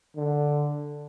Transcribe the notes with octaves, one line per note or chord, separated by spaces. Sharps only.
D3